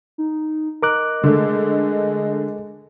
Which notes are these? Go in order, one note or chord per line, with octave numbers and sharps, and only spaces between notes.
D#4
A#4 D#5 D6 F#6
D3 G#3 A3